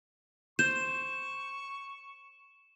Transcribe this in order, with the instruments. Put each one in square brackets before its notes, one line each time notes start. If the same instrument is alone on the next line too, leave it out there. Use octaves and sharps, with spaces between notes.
[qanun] C5 [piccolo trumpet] C#6 [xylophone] G6 [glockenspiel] E7